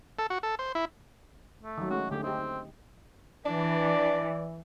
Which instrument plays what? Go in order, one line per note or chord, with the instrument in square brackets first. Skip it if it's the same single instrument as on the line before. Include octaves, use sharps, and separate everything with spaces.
[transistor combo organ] A4
F#4
A4
C5
E4
[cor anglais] A3
[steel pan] D#3 F#3
[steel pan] G#3 A3 C#4 [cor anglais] F#4
[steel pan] D3 A3 G#4 [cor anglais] G4
[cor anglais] C4 [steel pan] D#4 G4
[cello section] E3 [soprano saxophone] D4 [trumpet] D5